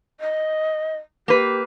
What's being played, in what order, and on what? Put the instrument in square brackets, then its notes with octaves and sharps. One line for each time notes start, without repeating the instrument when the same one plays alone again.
[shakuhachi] D#5
[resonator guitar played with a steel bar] A#3 B4 [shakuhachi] G4